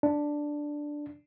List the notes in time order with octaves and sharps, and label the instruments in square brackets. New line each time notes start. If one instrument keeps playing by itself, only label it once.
[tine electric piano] D4